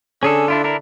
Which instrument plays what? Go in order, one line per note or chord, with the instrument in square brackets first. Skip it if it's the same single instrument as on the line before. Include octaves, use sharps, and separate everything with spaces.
[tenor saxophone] D3 [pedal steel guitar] C#4 G#4 A4
[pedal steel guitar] D4 E4 F4
D4 E4 A#4